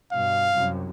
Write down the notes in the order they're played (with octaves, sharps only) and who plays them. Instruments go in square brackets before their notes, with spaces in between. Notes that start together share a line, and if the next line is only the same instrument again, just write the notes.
[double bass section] G2 B2 [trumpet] F5
[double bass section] C2 F#2